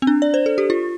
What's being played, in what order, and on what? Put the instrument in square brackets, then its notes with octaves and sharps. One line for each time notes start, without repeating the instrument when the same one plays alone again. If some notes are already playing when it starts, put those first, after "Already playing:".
[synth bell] C4
D4
D5
C5
A4
G4
F4